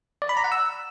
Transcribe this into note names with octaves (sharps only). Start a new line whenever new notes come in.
D5
B5
A#5
F#5
E6